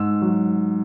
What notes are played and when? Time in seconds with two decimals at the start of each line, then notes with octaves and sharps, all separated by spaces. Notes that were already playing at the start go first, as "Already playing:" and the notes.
Already playing: G#2 E6
0.22 F#3